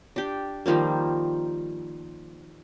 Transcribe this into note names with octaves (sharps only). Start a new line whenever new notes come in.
D4 G4
D#3 F3 G3 A#3